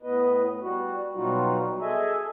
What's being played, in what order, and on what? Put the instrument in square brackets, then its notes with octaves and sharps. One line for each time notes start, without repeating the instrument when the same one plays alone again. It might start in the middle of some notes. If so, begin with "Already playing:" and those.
[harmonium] A2 B3 B4 D#5
G3 F#4
B2 F#3 G3 D#4 F4 F#4
G#4 A4 D#5 E5 G#5